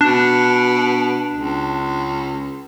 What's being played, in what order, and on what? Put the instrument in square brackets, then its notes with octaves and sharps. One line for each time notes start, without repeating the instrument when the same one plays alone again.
[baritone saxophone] B2 [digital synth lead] D4
[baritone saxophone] C#2